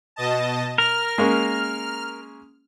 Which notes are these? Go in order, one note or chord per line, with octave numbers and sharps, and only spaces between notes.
B2 D#5 A5
A#4 F6
G#3 A#3 C#4